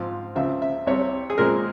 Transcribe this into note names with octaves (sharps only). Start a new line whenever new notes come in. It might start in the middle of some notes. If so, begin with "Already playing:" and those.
Already playing: G#2 F3 C4 F5
C#2 C#3 F3 C4 E5
E5
C2 C3 G3 C4 C#5
G#4
A#2 G#3 C4 A#4